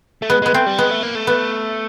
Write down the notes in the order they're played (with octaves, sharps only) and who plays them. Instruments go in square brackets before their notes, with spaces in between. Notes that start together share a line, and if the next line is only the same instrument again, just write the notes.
[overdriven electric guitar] A3
[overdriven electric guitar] G#3 [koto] B3
[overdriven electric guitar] G#3 [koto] B3
[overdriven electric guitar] A3 [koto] C4
[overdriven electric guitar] G3
[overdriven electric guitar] G#3 [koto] B3
[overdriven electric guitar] A3
A#3
A3
[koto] B3